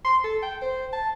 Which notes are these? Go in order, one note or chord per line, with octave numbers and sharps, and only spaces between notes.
C6
A4
G5
C5
A5